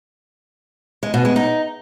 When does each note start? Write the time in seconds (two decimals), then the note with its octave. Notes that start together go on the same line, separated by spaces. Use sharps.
1.03 G#3
1.14 B2
1.25 G#3
1.36 D#4